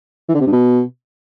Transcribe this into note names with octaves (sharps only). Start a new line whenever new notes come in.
E3
D3
C3
G2
B2